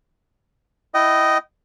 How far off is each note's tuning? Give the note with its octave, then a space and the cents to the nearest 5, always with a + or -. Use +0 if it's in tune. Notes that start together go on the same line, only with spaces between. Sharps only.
E4 +0 D#5 +0 G5 -30